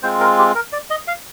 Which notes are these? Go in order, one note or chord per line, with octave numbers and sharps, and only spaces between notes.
G#3 C4 F4 C5
A#4
G4
A#4
D5
D#5
F5